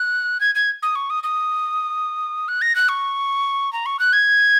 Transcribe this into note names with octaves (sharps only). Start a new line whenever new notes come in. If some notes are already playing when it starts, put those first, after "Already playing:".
Already playing: F#6
G#6
G#6
D#6
C#6
D#6
D#6
F#6
A#6
F#6
C#6
A#5
C#6
F#6
G#6